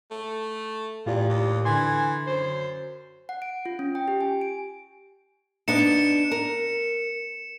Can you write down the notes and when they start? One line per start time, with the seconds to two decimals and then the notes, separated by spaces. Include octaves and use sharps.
0.11 A3
1.06 E2 A2 F4 G4 D5
1.29 D#2
1.65 D3 E3 G#5 C6
2.27 F#2 C5
3.29 F#5
3.42 D7
3.66 F4
3.79 C#4
3.95 G5
4.08 G4
4.21 G#5
4.41 D7
5.68 B3 D4 D#4 C#7 E7
6.31 A#4